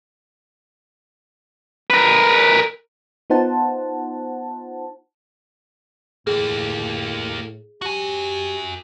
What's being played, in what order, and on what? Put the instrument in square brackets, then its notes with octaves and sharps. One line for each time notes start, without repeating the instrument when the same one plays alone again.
[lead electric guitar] A#4 B4
[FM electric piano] B3 D#4 F4 C5 F#5 A5
[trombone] A2 [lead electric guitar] A#3 G4 [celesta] G#4
[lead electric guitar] F#4 G#5 [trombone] G4